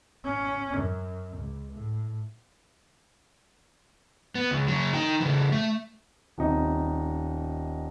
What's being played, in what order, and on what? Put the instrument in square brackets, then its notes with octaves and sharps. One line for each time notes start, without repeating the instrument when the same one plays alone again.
[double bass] C#4
F#2
C#2
A2
[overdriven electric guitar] B3
C#2
C#3 F#3
D#4 G5
C#3 E3
A3
[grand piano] D#1 C3 D#4